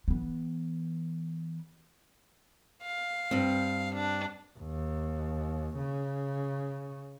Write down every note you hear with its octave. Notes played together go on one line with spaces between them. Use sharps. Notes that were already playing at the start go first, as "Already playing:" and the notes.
E3 B3
F5
G2 C4
D4
D#2
C#3